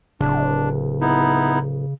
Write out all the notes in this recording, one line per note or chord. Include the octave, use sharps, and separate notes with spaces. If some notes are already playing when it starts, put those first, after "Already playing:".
D1 C#3 D4
B3 D#4 E4